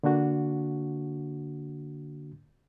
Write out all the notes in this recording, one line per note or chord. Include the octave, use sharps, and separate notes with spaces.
D3 A#3 D4 F#4